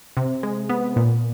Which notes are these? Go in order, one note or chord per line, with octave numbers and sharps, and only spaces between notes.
C3
G#3
B3
A#2